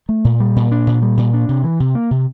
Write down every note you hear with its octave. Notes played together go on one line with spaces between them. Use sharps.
A3
A#2
G3
A#2
D4
A#2
G3
A#2
D4
C3
E3
C3
A#3
C3